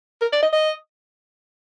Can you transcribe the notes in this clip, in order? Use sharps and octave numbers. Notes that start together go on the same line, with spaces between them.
A#4
D5
D#5
D#5